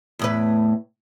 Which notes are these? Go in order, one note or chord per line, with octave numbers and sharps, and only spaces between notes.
E2 A2 B4